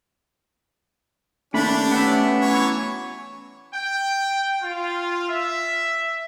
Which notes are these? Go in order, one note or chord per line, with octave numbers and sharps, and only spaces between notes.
D#2 A3 C#4 D4 G4 B5
B3 C#4 E5
E3 F#3 C#5
G5
F4
E5